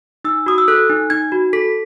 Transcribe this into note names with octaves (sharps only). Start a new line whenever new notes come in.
D#4 E6
F#4 D#6
E6
A4 F#6
D#4
D#4 G#6
F#4
A4 B6